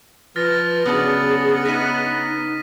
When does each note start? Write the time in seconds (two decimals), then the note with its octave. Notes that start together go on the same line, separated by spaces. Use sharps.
0.36 F3 B4 F6 A6 A#6
0.85 C#3 F#3 B3 D4 G#4 D#6
1.65 D#4 B4 C#5 E5 A#6 B6 D#7